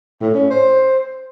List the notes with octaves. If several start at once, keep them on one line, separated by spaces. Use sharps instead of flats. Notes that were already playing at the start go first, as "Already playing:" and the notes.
A2
C#4
C5